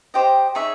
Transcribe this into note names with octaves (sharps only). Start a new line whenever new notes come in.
G4 C5 D#5 G5
D#4 G#4 C#5 E5